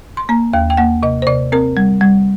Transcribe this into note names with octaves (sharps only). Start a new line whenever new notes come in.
C6
A#3 A#5
D#2 G5
G5
A#3 F#5
C3 D#5
C5
C3 D5
C4 A#4
G3
G3